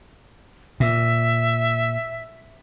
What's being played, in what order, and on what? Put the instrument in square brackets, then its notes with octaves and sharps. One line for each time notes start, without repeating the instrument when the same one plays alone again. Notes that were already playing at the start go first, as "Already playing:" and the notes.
[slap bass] A#2 [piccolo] E5